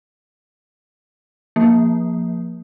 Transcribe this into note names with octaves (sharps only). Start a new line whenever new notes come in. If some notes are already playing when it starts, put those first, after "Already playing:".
F3 A#3